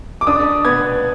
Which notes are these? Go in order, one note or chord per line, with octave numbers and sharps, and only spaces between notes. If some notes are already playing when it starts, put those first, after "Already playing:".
D6
D4 D#6
B3 G#6